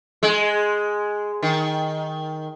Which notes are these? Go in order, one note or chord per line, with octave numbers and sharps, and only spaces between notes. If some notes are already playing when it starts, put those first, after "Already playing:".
G#3
D#3